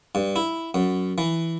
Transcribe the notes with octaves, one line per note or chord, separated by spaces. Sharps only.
G2
E4
F#2
E3